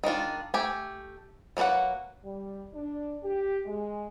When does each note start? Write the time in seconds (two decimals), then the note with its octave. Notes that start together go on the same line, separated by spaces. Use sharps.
0.04 D#3 G#3 D4 F4
0.54 A3 G4 G#5
1.57 F#3 A#3 D4 B4 F#5
2.23 G3
2.72 D4
3.23 G4
3.65 G#3